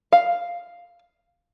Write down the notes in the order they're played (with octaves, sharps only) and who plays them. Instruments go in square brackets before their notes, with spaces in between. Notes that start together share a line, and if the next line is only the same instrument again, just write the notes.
[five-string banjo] F5